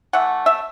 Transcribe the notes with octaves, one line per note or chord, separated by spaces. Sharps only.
E3 A3 F#5
E5